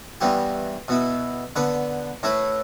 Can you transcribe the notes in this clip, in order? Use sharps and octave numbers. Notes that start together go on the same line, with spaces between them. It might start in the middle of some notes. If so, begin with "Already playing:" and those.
G2 E3 G3 B3 G4
B2 B3 E4
D3 B3 D4 B4 D5
A2 A3 E4 B4